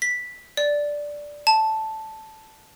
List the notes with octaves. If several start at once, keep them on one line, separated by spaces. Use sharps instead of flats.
B6
D5
A5